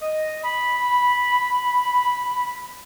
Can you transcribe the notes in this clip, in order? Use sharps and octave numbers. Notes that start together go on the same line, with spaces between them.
D#5
B5